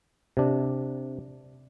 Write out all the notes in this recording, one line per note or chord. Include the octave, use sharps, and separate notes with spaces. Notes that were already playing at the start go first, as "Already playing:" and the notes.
C3 D4